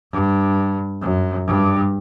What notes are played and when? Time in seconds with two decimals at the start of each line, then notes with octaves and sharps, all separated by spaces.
0.12 G2
1.02 F#2
1.46 G2